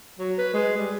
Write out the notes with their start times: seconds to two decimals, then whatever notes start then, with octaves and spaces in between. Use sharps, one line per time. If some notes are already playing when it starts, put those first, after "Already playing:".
0.19 F#3
0.38 B4
0.54 G#3
0.77 G3